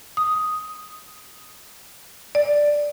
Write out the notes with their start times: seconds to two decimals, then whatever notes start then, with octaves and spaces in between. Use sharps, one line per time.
0.17 D#6
2.35 D5